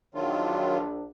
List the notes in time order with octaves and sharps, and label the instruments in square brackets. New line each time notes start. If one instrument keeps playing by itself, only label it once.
[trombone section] A#1 D4 [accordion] D#3 F#3 F4